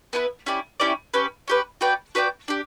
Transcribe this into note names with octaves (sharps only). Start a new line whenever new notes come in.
B3 E4 B4
C#4 E4 G4 D5
C#4 E4 G4 D5
C#4 G4 B4
C#4 G4 B4
F#4 B4 D5 G5
F#4 B4 D5 G5
D4 G4